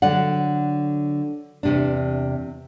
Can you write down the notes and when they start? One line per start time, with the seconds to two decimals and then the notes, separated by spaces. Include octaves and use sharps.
0.02 D3 F#3 D5 F#5
1.63 E2 C3 D4